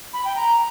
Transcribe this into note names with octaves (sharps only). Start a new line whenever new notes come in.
B5
G5
A#5